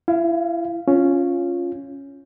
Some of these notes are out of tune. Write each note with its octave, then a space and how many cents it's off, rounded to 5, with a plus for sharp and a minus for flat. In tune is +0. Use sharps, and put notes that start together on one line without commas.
E4 +30 F5 -10
C#4 +0 F4 +0